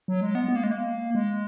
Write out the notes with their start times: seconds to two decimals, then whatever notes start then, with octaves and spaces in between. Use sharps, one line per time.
0.08 F#3
0.21 G#3
0.35 B3
0.48 B3
0.56 A#3
0.63 G#3
0.71 A#3
1.15 G#3